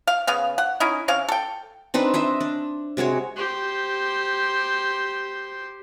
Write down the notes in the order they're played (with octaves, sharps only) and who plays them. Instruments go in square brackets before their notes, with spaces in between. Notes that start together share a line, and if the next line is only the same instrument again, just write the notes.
[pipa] F5
C#3 B3 F5
F#5
C#4 D#4 E4
C3 C#4 F5
A4 G5
[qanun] C4 D4 D#4 B4
D4 C5 D#5 E5
D4
C3 G#3 F#4 C#5
[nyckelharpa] G4 C5